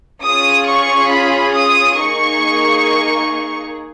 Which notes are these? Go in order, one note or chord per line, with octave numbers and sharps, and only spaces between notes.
C#4 F4 G#4 D#6
C#6
B5
D#6
A#3 D#4 G#4 C#6